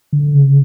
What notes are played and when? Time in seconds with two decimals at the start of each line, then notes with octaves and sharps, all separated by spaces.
0.13 D3
0.34 C#3